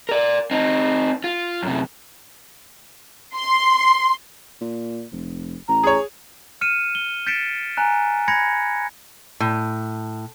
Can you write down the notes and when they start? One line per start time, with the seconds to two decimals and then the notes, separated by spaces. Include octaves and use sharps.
0.09 A#4 D5
0.51 C4 D#4
1.24 F4
1.63 F#2 C3
3.33 C6
4.61 A#2
5.12 F1
5.68 A1 A#5
5.83 G#4 C#5
6.61 F6 C#7 D#7 E7
6.95 G7
7.27 G6 A6 B6 C#7 D7 E7
7.77 G#5 A#5 F#6
8.28 B5 G#6 A#6 C#7
9.40 A2